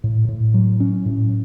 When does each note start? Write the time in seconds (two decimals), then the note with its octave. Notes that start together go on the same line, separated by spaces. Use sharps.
0.04 A2
0.29 A2
0.54 F#3
0.80 C#4
1.06 A2